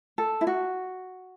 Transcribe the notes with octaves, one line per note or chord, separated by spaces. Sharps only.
A4
E4
F#4